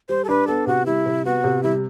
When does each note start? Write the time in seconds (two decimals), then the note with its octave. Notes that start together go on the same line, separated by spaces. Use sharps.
0.09 G3 C5
0.24 A4
0.29 D4 B4
0.47 B3 A4
0.67 C3 F#4
0.86 G3 E4
1.06 C3
1.25 B3 F#4
1.44 C3
1.63 G3 E4